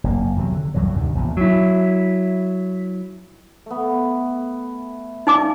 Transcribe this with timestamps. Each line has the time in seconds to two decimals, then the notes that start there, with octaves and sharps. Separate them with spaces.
0.04 F#1 A#3
0.36 E2 C3 E3 F#3
0.53 D3
0.74 C#2 G2 E3 F#3
0.93 D2 G2 C3 D#3
1.15 A#1 E2 A#2
1.37 F#3 E4
3.66 A3 B3
5.27 D#4 F4 D5 G#5 D6